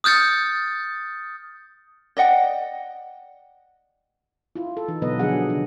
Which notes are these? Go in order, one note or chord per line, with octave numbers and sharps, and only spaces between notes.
D#6 F6 G6 A6 C#7
D5 D#5 F#5 G5
E4 F4
A4
E3 D#4
B2 D3 F#3 B3 B4 D#5
D3 F3 F#3 D4 G#4 F#5
C#3 D4